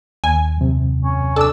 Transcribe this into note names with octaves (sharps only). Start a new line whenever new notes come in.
D#2 G#5
F#2 C3
C#4
D4 A4 E6